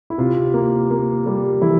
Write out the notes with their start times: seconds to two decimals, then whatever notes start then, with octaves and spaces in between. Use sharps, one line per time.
0.10 E4
0.18 C3 F4
0.54 A#3
0.91 A#3
1.26 G3
1.61 E3 E4